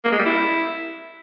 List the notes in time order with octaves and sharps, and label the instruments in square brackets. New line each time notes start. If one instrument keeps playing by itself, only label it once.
[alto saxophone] A#3
G#3
G3
E4